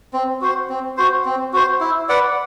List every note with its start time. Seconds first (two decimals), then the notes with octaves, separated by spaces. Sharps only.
0.13 C4
0.42 F#4 C5
0.69 C4
0.97 F#4 C5
1.25 C4
1.53 F#4 C5
1.81 E4
2.09 B4 D5 F#5